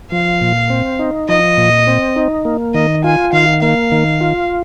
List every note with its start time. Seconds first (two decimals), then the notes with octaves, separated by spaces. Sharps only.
0.12 F3 F5
0.41 A#2
0.70 C4
0.99 D#4
1.29 F3 D#5
1.58 A#2
1.87 C4
2.16 D#4
2.45 A#3
2.74 D#3 D#5
3.04 F4 G#5
3.33 D#3 F5
3.62 A#3 F5
3.92 D#3
4.21 F4